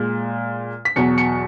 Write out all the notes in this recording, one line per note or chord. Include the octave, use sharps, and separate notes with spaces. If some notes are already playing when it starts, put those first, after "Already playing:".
Already playing: A#2 G#3
B6
E2 B2 F#3 C#7
C#7